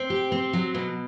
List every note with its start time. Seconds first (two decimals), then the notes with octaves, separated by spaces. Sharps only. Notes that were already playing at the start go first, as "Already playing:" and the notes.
Already playing: C4
0.10 G4
0.32 C4
0.53 F#3
0.74 B2